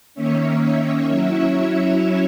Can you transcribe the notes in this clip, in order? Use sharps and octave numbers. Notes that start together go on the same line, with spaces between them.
D#3 A#3 C#4 C#5 E5
C#5 E5
F#3 C#4 E4 C#5 E5